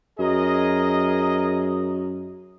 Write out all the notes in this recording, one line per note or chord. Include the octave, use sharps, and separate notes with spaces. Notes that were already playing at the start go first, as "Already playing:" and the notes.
F#2 G#4 A#4 D#5